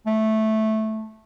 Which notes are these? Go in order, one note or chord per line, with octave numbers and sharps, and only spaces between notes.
A3